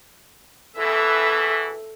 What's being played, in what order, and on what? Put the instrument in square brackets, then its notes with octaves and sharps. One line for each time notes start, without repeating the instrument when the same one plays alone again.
[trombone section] E2 B2 E3 [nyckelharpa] A4 E5